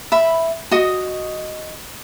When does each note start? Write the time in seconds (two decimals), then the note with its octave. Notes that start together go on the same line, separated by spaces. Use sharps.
0.12 E5 B5
0.71 F#4 D#5 D#6